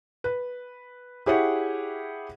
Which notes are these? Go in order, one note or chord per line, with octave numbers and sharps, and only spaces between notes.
B4
E4 G4 G#4 C#5 E5 F#5